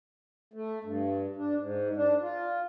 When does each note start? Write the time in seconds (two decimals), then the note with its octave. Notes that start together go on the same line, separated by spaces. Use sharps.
0.54 A3
0.84 G2
1.36 D4
1.58 G#2
1.96 D4
2.21 F4